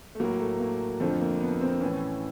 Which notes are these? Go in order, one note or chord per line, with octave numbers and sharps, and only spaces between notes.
A3
A2 F#3 A#3
A3
A#3
F2 D3 F3 A3
A#3
B3
C4
A2 E3 C#4